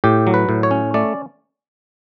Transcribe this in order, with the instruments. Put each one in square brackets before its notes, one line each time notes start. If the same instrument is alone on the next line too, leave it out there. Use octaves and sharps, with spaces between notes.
[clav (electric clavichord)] A2 G4
F#3
B4
A2
C#5
C#4
A3 D5